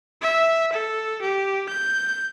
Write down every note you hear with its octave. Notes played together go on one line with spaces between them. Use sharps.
E5
A4
G4
G6